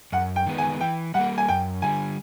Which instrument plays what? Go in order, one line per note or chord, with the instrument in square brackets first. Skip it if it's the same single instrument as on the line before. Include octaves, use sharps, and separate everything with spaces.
[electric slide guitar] F#2 [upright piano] F#5
[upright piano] G5
[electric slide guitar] D#3 G#3 B3
[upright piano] G#5
[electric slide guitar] E3 [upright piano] G5
[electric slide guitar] G3 A#3 [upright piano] F#5
[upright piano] G#5
[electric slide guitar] F#2 [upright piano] G5
[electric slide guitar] D3 G3 [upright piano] G#5